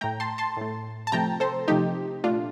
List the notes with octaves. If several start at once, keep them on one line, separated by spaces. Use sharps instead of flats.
A2 A3 G5 A#5
A5 C6
A5 C6
A2 A3
A5
C3 F3 A3 G5 A#5
A4 C5
C3 F3 A3 D#4 G4
A#2 A3 D4 F4